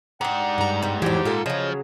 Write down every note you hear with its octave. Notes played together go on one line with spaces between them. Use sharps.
G#2 D4 G4 F#5
G2 A#5
G3 B3
F2 A2 E3 F#3 D4 G4
A#2 F4 A4 F#5
C#3 F3 F#3 C#5 D#5